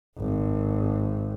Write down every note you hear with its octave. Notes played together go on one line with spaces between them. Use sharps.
G#1